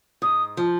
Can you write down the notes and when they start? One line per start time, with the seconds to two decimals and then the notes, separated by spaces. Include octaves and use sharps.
0.22 G#2 D#6
0.57 F3